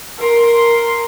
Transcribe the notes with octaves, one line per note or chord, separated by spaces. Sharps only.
A#4 C6